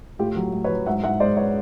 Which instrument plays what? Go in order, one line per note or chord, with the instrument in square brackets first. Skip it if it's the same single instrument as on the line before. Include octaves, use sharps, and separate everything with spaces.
[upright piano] A2 F4 G4
F#3
A2
B4 C#5
F#3
G#2 E5 F#5
G#2 E5 F#5
G#3 C5 D5
B4 C#5